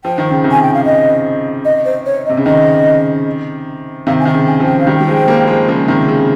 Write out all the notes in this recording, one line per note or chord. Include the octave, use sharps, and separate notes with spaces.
F3 G5
D#3
C#3
C3 D#3
G#5
G5
F5
D#5
D#5
C5
C#5
D#5
C3
C#3
C3 D#3 D#5
C3 D#3 F5
G#5
D#3 G5
C#3
G#5
C#3 F3
G5
F5
D#3 G3
G5
G3
F3 G#3
C4
G3 A#3
F3 G#3
C#3 F3
C3 D#3
C#3